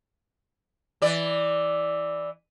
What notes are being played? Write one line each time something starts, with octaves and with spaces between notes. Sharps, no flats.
E3 D5